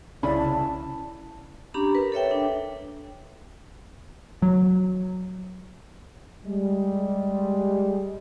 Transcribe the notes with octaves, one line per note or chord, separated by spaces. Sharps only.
C2 C#3 C#4 E4 D5 B5
A5
C#4 D4 G4 A#5 B5
A#4 B4
A4 C#5 E5 G5
D4
F#3
G3 G#3